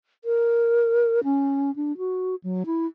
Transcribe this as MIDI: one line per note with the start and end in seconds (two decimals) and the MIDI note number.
0.25 1.20 70
1.24 1.74 61
1.76 1.96 62
1.98 2.35 66
2.44 2.63 54
2.66 2.86 64